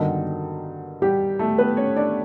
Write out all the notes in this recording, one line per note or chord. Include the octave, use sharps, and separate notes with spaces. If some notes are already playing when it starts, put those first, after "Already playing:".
Already playing: G2 D3 D#3 F#3 A#3 D#4
G3 G4
A3 A4
B3 B4
C#4 C#5
D4 D5